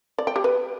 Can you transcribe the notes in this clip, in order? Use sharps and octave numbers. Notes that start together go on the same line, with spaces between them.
D5
G5
G4
B4